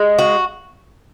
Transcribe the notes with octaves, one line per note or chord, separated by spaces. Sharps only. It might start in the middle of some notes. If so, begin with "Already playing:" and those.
Already playing: G#3
F#4